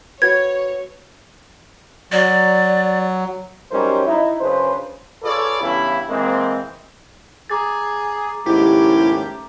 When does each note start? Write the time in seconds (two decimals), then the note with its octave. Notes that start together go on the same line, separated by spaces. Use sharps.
0.22 F#4 B4 C#5 G#6
2.12 F#3 D5
3.71 F#3 G3 C#4 D#4 A#4 C5
4.06 D#4 E4
4.40 F#2 C#3 D4 B4 C5
5.23 F4 G#4 A4 B4 C#5 D5
5.61 G2 C#3 E3 B3 E4 B5
6.09 E3 G#3 A#3 C4
7.50 G#4 A#5 D6 A6
8.46 D#2 G#2 C#3 A3 E4 G4